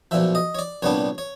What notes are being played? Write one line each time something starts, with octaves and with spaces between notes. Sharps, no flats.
B1 A#2 F3 E5
D#5
C#5
D5
C2 A#2 G3 B3 D4 C#5
C#5